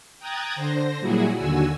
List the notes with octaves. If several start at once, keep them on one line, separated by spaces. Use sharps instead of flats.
G5 A#5 D#6 F#6 G#6 A6
D3 C5 A#6
A#2 F#3 G3 E4 F#4 G#4
D#2 D3 F#4 G#5 E6